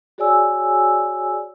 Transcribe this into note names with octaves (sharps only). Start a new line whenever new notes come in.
F#4 G#4 C#5 D5 G#5 E6